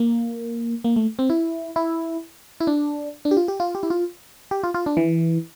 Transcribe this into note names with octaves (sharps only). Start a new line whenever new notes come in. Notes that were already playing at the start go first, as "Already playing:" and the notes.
Already playing: A#3
A#3
A3
C4
E4
E4
E4
D4
D4
G4
F4
G4
F4
G4
E4
F4
G4
F4
F4
D4
E3